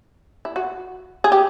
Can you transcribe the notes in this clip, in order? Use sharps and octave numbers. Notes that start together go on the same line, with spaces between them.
E4
F#4
G#4
G4